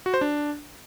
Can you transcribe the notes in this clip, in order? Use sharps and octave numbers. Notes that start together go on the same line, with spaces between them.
F#4
C5
D4